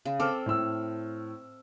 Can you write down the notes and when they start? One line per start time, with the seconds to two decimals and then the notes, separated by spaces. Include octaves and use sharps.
0.05 C#3
0.20 C4 A4 D6 F6
0.46 A2 E6